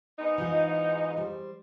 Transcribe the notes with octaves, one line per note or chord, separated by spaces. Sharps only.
G#2 B3 D#4
E3 F4 G#4
G3 C5